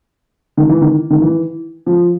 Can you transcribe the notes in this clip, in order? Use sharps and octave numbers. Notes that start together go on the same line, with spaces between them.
D#3
E3
D#3
D#3
E3
F3